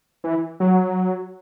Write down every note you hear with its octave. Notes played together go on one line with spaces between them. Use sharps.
E3
F#3